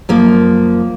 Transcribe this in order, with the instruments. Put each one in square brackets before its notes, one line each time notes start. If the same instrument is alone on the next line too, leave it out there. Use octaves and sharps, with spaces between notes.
[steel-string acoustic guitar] F#2 F3 A#3